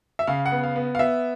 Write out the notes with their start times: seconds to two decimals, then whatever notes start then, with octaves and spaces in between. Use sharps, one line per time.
0.19 E5
0.27 C#3 F5
0.46 F#5
0.52 B3
0.64 F5
0.76 B3
0.95 F5
0.99 B3 E5